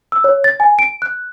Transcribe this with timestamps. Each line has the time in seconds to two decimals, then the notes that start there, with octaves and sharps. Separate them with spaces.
0.12 E6
0.24 C#5
0.44 A6
0.60 G#5
0.79 D7
1.02 F#6